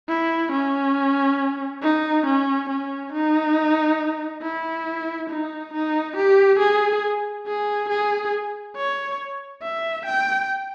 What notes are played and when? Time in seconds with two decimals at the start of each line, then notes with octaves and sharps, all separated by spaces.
0.09 E4
0.52 C#4
1.82 D#4
2.26 C#4
2.70 C#4
3.13 D#4
4.42 E4
5.30 D#4
5.73 D#4
6.16 G4
6.60 G#4
7.47 G#4
7.89 G#4
8.76 C#5
9.63 E5
10.06 G5